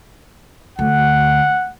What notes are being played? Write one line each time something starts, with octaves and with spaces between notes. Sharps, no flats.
D2 F#5